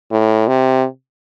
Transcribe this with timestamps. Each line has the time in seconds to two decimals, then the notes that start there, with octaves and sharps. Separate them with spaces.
0.11 A2
0.47 C3